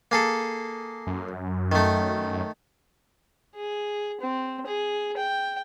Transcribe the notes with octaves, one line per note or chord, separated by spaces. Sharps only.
A#3 G#4 A4
F#2
D#3 A3
G#4
C4
G#4
G5